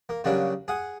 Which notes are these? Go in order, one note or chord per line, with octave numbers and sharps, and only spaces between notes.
A#3
C#3 F#3 G3 A#3 C#4 D4
G#4 F#5 G#5